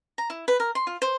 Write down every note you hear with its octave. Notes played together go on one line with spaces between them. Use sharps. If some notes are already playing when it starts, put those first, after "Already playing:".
A#5
E4
B4
A#4
C6
F4
C5